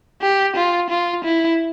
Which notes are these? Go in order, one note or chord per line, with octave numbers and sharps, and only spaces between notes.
G4
F4
F4
E4